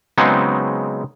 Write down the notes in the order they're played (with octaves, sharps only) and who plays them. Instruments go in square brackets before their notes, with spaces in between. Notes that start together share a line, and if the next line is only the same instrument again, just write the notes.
[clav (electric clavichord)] C#3 F#3 G#3 B3 C4 D#4